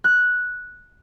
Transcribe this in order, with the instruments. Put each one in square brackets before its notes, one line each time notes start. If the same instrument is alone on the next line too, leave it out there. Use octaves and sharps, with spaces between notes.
[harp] F#6